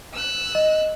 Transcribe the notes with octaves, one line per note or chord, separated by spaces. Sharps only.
E6 F#6
D#5